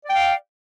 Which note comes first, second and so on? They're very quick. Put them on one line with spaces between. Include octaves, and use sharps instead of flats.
D5 G5 F5